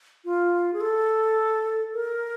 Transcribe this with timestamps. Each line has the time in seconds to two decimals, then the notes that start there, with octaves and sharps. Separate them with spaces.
0.25 F4
0.74 G#4
0.81 A4
1.94 A#4